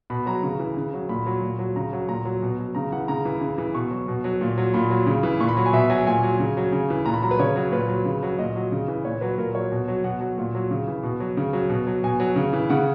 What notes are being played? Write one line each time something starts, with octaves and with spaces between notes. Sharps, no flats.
B2 B5
F#3 A#5
C#3
E3
C#3
F#3
A#2 B5
F#3
A#2
F#3
C#3 A#5
F#3
A#2 A#5
F#3
B2
F#3
C#3 A#5
E3 F#5
C#3 A#5
E3
C#3
E3
B2 C#6
F#3
B2
F#3
A#2
F#3
A#2 B5
F#3
C#3
E3
A#2 C#6
B5
F#3
G#5
B2 E5
F#3 G#5
A#2 G#5
F#3
C#3
F#3
C#3
E3
A#2 A#5
B5
F#3 A#5
B4
C#3 C#5
F#3
A#2 B4
F#3
C#3
F#3
A#2 D#5
F#3
C#3
E3
A#2 C#5
F#3 B4
A#2 A#4
F#3 C#5
B2
F#3
B2 F#5
F#3
A#2
F#3
C#3
E3
B2
F#3
C#3
F#3
B2
F#3
B2 G#5
F#3
C#3
E3
C#3 F#5